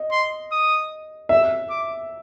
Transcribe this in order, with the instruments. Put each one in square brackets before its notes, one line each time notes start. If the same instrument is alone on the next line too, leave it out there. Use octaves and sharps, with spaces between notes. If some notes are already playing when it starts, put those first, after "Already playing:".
Already playing: [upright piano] D#5
[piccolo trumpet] C6
D#6
[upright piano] E5 [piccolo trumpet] E6
[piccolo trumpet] D6